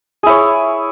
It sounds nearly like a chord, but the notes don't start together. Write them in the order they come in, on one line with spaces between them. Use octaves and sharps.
G#4 E4 C#5